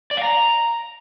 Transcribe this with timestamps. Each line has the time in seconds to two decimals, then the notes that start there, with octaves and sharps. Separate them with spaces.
0.11 D5
0.17 F5
0.23 A#5